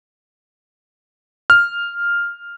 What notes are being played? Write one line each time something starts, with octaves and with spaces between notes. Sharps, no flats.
F6